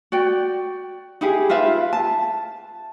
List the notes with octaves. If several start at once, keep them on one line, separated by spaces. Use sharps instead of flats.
F#4 D5 G5
D#4 E4 G4 G#4
F4 B4 E5 F5
A5